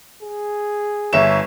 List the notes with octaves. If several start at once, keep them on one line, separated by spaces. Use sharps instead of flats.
G#4
G1 C#5 E5 E7